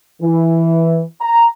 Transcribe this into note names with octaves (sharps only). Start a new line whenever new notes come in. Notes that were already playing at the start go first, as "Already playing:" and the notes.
E3
A#5